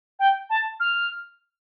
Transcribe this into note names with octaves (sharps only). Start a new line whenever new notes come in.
G5
A5
F6